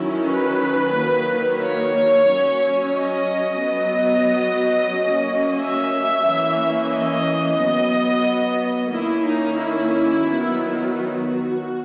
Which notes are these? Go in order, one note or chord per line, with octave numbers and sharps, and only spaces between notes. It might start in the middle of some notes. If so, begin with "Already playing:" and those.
Already playing: D#3 F#3 C#4 E4
B4
D#3 F#3 A#3
C#5
F#3 C#4
D#5
F#3 B3
F#3 A#3 C#4
E5
E3 A#3 C#4
D#5
F#3 B3
D#3 A#3 C#4 E4
D#4
E4
D#3 F#3 B3
F#4